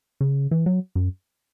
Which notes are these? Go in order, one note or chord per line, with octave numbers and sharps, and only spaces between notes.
C#3
E3
F#3
F#2